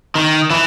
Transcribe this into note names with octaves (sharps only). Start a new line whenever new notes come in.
D#3
E3